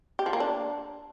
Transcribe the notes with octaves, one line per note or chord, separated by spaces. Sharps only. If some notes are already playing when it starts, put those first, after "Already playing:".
G4
F3
A#3
D4